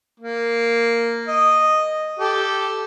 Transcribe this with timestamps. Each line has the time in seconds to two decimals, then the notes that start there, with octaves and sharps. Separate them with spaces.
0.20 A#3
1.28 D#5
2.19 G4 A4